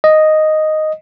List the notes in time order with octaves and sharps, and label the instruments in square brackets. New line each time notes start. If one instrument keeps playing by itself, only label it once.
[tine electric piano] D#5